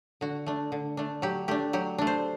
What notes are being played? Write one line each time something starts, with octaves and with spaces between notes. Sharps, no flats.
D3 F#4
A3 D4
D3
A3 D4
F#3 G4
A3 D4 G4
F#3 G4
A3 D4
C5